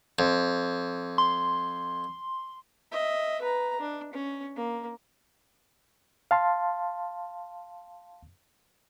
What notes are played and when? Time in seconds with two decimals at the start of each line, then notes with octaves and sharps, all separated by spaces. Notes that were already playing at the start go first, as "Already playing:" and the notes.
0.19 F2
1.18 C6
2.92 D#5 E5
3.42 B4 A#5
3.80 D4
4.14 C#4
4.56 A#3
6.31 F5 A5 C6